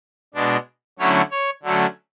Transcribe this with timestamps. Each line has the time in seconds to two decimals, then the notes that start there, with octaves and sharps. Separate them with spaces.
0.34 B2 G#3 D4
0.99 D3 F#3 A3 C#4 E4 C#5
1.31 C#5
1.63 D3 F#3 A3 C#4